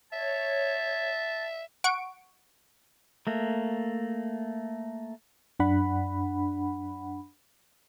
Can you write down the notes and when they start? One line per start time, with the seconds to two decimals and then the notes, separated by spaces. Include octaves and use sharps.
0.13 C#5 E5 A5
1.84 F#5 C#6 D7
3.27 A3 A#3
5.59 F#2 D4 F#5 B5